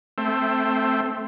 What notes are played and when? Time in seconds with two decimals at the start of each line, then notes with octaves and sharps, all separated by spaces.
0.18 A3 C4